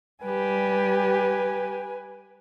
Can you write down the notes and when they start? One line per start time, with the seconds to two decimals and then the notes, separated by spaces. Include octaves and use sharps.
0.24 G3 G4 B4 G#5